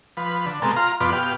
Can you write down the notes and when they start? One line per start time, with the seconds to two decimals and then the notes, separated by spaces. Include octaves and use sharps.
0.17 F3 B4
0.46 D3
0.62 B2 G#3 A#3 C4 A4
0.76 F4 F5 A#5 C6
1.01 F2 B2 F4 B4 D5 C6
1.12 B2 G4 F5